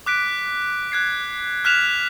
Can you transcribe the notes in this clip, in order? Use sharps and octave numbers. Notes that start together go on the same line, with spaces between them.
D6 F#6 B6 D7
F#6 G#6 C7
F6 F#6 B6 E7 F7